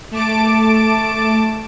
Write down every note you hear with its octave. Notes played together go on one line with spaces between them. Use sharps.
A3 A5 D6 D7